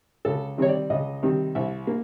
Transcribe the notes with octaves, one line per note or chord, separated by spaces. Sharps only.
C#2 A4
C3 D#3 G3 C4 C#5
D5
C#2 D#5
C3 D#3 G3 C4
C2 E5
A#3